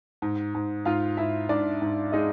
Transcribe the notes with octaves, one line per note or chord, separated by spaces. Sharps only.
G#2
G#2
G#2 F4 F5
G#2 E4 E5
G#2 D4 D5
G#2
G#3 D#4 D#5